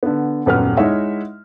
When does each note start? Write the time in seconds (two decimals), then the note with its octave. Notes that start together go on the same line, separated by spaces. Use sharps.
0.03 D3 B3
0.46 D#1 F#2 B3 B4 F#5 F6
0.77 G#3 D#4 E4 C#5 E5 F#5